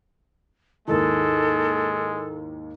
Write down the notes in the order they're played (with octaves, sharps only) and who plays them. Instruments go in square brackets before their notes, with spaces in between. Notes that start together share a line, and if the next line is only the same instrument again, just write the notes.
[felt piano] D#2 G#2 D#3 [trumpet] G#3 [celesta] E4 A#4 [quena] A4